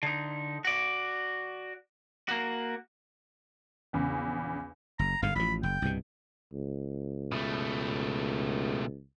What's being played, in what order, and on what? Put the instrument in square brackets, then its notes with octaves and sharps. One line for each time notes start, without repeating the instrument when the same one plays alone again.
[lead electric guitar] D3 D#4
F#4 D5
A#3 F#4
[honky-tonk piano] A#1 E2 C#3
[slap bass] F#1 [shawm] A#5
[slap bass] G1 G#2 D3 [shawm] F5
[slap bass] A1 F3 [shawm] B5
[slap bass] F#1 [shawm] G5
[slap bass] C2 G2 B2
[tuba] C#2
[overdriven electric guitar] B2 A3